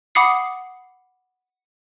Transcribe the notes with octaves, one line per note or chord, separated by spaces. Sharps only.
F#5 B5 D6 D#6 C7 C#7